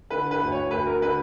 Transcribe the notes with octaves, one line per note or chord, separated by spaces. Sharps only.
D3 B4
B4
D2
C#5
D2 B4
A#4
D3 B4